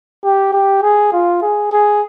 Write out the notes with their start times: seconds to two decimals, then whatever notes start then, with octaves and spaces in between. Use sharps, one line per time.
0.24 G4
0.53 G4
0.82 G#4
1.12 F4
1.42 G#4
1.72 G#4